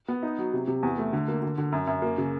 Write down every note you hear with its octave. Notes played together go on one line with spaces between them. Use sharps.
B3
D#4
F#3
C3
C3
E2
A3
D3
A#3
D3
D3
F#2
F#2
A#3
C#3